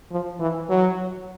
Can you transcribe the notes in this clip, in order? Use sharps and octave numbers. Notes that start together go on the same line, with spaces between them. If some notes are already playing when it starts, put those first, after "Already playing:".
F3
E3
F#3